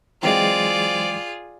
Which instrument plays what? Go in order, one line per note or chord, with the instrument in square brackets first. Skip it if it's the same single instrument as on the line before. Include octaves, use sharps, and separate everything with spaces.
[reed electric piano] E3 F#3 G#3 [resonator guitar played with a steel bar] C4 [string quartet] F4 G#4 [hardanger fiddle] D5